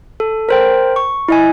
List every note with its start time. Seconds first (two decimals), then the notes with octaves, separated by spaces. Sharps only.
0.20 A4
0.49 A#4 C5 G5
0.96 C#6
1.28 E4 D#5 G#5